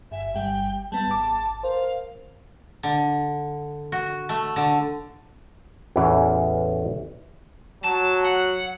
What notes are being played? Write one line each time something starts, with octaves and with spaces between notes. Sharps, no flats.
G1 E5
G1 G3 G5
G3 B3 A5
G#1 D6
A#4 C5 F5
D3
F#4
A3
D3
A1 E2 E3 C#4 E4 E5
F#3 A5
F#5